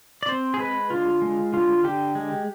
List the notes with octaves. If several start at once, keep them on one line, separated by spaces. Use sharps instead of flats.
D5
C4 C5
G#4
G#3 B4
D3 F4
G#3
D3 F4
D3 G4
G#3